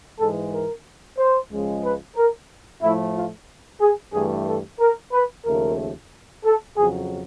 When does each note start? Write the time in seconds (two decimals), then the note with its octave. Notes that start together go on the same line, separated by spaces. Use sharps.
0.20 G#2 E3 G#3 A4
0.52 A#4
1.18 C5
1.50 C#2 C#3 F3 G#3
1.84 B4
2.17 A#4
2.82 A2 F3 A3 E4
3.15 F4
3.81 G#4
4.13 G2 E3 A3 G#4
4.47 A4
4.80 A#4
5.13 B4
5.46 D#2 C#3 F3 A3 A#4
6.44 A4
6.77 F2 C#3 F#3 G#4